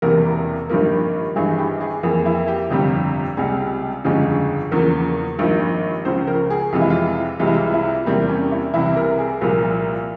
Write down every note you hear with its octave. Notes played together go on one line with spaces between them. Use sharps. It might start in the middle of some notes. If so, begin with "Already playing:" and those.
E1 E2 C3 E3 A#3 A#4
G#1 G2 F3 A#3
G#1 G2 E3 G#4
G4
G#4
F2 E3 A#3 G#4
E4
G4
G1 F2 C3 G3
C#2 C3 G3 G#4
G1 F2 C#3 F3 G#3
E2 C#3 F3 A#3 A#4
G#1 G2 F3 A#3
C#2 C#3 F3 C5
A#4
G#4
F2 C3 E3 G#3 F4
E4
F4
C2 C3 E3 G#3 F4
E4
F4
E4
E2 C3 G3 A#3 C4
C#4
E4
C2 C3 E3 E4
A#4
G#4
C2 A#2 F3 A#3 F4